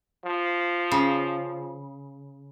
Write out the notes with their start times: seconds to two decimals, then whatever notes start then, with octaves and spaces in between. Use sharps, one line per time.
0.25 F3
0.92 C#3